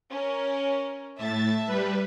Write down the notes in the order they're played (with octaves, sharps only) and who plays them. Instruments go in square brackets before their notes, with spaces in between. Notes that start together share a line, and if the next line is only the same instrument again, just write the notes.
[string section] C#4 A#4
[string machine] A2 A6 [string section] E5 A5
[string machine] G3 B4